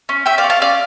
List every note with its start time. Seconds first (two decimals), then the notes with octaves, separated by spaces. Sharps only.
0.09 C#4
0.26 C#4 E5 G5
0.38 D5 F5
0.44 C#4
0.50 F5 A5
0.62 C#4 D5 F5